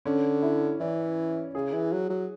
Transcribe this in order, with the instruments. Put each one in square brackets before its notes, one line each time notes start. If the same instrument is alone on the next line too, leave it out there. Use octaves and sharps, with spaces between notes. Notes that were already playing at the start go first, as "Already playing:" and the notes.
[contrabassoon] D3 [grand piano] C#4
[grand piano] E4
[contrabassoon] E3 [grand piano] D5
[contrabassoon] C#3 [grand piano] G#4
[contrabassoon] E3
F#3
F#3